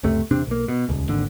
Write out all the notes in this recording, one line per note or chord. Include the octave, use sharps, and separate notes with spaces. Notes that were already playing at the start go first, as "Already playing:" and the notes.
F#1 C#2 C3 A3
E1 C3 C4 D4
B1 A#3
B2
D#1 C#2
G#1 D#2 D3